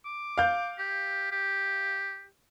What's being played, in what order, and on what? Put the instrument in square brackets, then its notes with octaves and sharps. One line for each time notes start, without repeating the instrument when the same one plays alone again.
[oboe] D6
[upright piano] F5 G6
[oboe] G4
G4